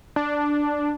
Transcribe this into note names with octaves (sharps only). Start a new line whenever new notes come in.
D4